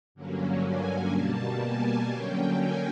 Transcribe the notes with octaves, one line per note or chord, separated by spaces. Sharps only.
G2 D3 F#3 A#3 C#4
G#5
B2 G3 A#3 A5
G#5
D3 F#3 A#3 C#4 G5
G#5